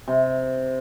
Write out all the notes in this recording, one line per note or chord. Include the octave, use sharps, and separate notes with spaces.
C3